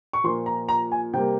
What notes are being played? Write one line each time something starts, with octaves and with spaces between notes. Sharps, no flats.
C#6
A#2 F3 A#3 C6
A#5
A#5
G#5
C3 G3 A#3 G5